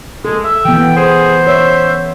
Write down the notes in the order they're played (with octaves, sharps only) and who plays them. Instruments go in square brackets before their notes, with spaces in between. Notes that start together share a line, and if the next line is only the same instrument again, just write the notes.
[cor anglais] G#3 [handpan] A4
[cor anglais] E5
[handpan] E3 B3 [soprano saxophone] G5
[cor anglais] G#4 [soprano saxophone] C5
[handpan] C#5 [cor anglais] E5